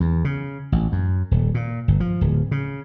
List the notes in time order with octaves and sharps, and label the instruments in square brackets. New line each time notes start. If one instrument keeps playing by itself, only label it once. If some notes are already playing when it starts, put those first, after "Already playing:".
[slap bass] E2
C#3
A1
F#2
D#1
A#2
G1
F3
D1
C#3